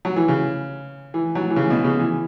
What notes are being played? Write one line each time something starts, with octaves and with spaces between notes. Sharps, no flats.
F#3
E3
C#3
E3
F#3
E3
C#3
B2
C#3
E3